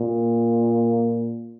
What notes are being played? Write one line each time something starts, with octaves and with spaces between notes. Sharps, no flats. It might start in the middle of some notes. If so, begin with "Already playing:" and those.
Already playing: A#2